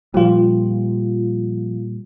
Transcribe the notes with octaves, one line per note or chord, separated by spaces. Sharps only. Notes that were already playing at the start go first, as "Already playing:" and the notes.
A#2 F3 G3 F4